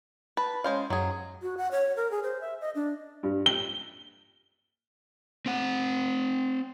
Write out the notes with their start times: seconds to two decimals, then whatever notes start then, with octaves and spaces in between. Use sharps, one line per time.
0.37 B4 A5
0.64 G#3 C#4 C5 F5
0.90 F#2 F#3 G#4
1.42 F#4
1.57 F#5
1.71 C#5
1.96 A#4
2.11 G#4
2.23 C5
2.41 E5
2.61 D#5
2.75 D4
3.23 G2
3.46 G7
5.46 C4 F#5